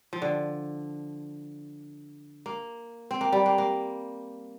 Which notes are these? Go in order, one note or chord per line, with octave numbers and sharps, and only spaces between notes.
F3
D3
A#3
C4
A#3
G3
A#3
A#3